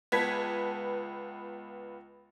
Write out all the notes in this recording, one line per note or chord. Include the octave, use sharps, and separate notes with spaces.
C#2 B3 B4 A5 G#6 B6